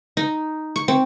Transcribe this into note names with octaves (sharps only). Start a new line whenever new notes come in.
D#4
C#6
C4